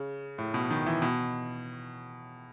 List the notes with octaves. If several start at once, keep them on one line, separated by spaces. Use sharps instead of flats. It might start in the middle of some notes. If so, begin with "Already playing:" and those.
Already playing: C#3
A2
B2
D#3
E3
B2